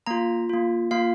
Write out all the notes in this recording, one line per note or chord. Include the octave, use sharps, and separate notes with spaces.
A#3 F4 A#5
A#3 F4
A#3 F4 F5